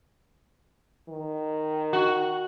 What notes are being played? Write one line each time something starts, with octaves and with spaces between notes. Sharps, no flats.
D#3
F#4